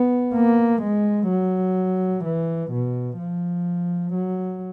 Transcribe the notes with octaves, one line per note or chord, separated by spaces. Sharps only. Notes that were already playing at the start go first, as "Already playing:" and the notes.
Already playing: B3
A#3
G#3
F#3
E3
B2
F3
F#3